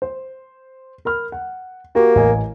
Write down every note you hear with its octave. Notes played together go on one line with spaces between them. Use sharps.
C5
A#4 B5 F6
F#5
A#3 F#4 G4
A1 D#5 G#5